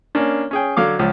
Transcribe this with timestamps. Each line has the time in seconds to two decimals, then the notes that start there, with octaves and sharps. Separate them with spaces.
0.15 A#3 C#4 D4
0.51 C#4 G#4 G5
0.77 D3 F#3 F5 D6
0.99 C#2 F3